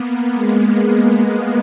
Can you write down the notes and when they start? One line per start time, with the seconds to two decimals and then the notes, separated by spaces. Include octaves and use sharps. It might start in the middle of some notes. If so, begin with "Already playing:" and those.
Already playing: A#3 B3
0.33 G#3
0.61 A#3
0.90 B3